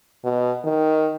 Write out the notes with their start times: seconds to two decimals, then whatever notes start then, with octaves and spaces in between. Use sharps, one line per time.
0.25 B2
0.64 D#3